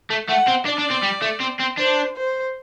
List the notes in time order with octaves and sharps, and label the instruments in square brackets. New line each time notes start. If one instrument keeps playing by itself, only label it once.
[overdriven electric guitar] A3
[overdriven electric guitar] A3 [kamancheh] F#5
[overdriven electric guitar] C4
[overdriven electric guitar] D4 [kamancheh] D5
[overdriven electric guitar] D4
C4
G3
A3
C4
C4
[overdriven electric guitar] D4 [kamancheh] C5
[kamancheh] C5